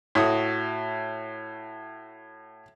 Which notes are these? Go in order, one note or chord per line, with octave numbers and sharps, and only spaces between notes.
A2 F#4 D#6